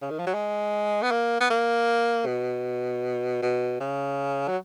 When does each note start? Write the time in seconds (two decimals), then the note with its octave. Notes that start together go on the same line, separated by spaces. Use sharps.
0.02 C#3
0.11 D#3
0.19 F3
0.27 F#3
0.34 G#3
1.02 B3
1.11 A#3
1.41 B3
1.50 A#3
2.26 B2
3.42 B2
3.80 C#3
4.48 F#3